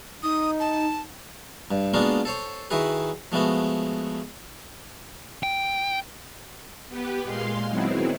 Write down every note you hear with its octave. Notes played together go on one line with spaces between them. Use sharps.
D#4 D#6
A5
G2
G#3 A#3 B3 D4 F4 F#4
A4 C5 C#5
D#3 E4 F#4 G#4 B4
F3 G#3 A3 B3 F#4
G5
B3 G4 B4
A#2 G#3 F5 C6
D#3 F#3 G#3 B3 C4 E4